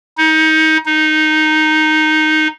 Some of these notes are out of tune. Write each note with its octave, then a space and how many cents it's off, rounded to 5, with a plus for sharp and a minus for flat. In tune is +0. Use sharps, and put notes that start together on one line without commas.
D#4 +25
D#4 -5